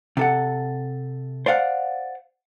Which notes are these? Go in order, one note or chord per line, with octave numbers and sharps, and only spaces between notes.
C3 A4 F#5
C5 D5 F5 F#5